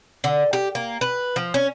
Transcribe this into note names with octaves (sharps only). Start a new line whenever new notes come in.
D3
G4
A#3
B4
F3
C#4